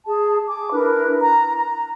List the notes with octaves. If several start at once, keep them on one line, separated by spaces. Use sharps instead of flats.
G#4 A5
G#5 D6
D4 E4 A#4 B4
A#5
A#5